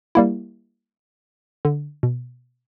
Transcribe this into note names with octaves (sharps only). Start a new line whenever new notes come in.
G3 A#3 E4
D3
B2